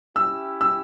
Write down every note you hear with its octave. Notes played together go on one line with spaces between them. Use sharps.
C#4 E4 G4 E6
E6